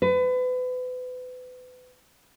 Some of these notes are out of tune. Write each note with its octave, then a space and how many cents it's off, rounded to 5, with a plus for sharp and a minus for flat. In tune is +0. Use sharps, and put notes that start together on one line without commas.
B4 +35